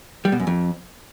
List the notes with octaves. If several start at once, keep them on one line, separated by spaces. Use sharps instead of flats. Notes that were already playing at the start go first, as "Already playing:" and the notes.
G3
B2
F#2
F2